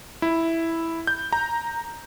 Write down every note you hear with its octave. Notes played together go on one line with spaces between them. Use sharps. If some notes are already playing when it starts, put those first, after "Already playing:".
E4
G6
A#5